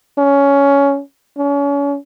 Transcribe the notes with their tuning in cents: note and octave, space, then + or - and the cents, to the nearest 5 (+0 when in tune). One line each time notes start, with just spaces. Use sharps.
C#4 +15
C#4 +35